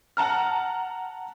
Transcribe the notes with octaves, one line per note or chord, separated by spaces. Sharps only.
F#5 A5 A#5 F6